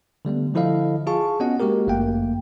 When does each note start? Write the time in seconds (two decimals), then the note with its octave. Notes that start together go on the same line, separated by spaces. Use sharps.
0.25 D3 G3 A3 B3
0.54 D3 F3 E4 A4 D#5 F5
1.07 F4 G#4 F5 A5 C#6
1.40 B3 C#4 F#4 D#5 F#5
1.60 G#3 A#3 F#4 G4 A#4
1.87 G1 F#2 A3 A#3 G5